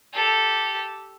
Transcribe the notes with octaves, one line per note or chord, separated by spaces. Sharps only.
G4 A4